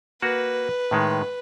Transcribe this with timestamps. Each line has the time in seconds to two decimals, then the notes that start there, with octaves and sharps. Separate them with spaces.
0.22 A#3 F#4 B4
0.91 A2 D#3 G#3